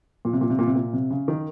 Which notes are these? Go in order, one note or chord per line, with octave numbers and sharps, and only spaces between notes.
A#2
C3
A#2
C3
A#2
C3
A#2
C3
C#3
D#3